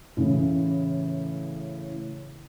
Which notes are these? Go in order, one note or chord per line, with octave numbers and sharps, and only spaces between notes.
A2 C#3 E3